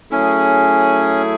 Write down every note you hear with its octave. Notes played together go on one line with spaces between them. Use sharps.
F#3 A3 C#4 E4 G#4